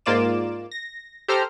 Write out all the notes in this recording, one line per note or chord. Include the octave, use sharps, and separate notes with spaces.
G#2 A#3 F4 D5 D6 E7
A#6
G4 A4 C5 A#5 F6